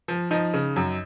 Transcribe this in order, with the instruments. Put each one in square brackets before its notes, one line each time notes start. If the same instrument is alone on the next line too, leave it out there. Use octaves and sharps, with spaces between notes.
[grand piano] F3
F3 D#4
C#3
F#2